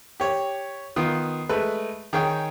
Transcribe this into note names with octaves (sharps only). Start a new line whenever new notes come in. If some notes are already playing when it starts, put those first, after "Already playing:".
G4 C#5
D#3 B3 F4
G#3 A3 B4
D#3 G#4 C#5 G5